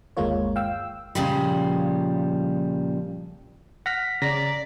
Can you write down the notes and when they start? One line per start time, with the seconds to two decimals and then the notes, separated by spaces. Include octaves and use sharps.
0.17 G1 D#2 G#3 A#3 F4 C#5
0.56 F5 G5 E6
1.15 A#2 C#3 F3 G3
3.86 F#5 F6 A#6 B6
4.22 C#3 D5 A#5 A#6 B6